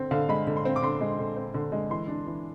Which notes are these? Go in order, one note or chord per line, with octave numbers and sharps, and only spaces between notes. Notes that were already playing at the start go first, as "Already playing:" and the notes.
Already playing: D3 C4
D3 F5
G#3 B5
D3
C6
C4
D6
D3 C6
G#3
D3
C4
D3
G#3
E3 C6
D4
E3